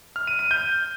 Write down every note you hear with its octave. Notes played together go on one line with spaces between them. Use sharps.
F6
D#7
D#7
G6